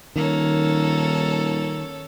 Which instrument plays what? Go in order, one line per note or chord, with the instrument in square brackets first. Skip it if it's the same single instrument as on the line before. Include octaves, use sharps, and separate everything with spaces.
[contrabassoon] D#1 [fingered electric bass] D#3 [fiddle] A#3 [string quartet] A4 C#5